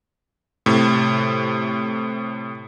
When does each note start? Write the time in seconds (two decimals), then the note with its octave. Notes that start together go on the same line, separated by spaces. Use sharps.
0.66 A2 C3